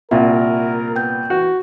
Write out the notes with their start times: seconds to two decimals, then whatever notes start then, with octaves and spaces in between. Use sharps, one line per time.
0.11 C2 A#2 A#4 E5 F#5
0.96 B3 G5 G6
1.30 E3 F#4